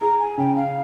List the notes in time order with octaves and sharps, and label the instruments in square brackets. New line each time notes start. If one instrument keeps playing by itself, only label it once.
[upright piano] G#4 [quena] A#5
[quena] G#5
[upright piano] C#3 [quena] G5
[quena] F5